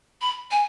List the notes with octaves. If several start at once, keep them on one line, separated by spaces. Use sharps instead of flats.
B5
G#5